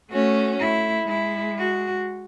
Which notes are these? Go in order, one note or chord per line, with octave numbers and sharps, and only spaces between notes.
A3 C#4 F#4
A3 E4
G#3 E4
F#4